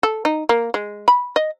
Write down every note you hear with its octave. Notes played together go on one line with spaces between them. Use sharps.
A4
D#4
A#3
G#3
B5
D#5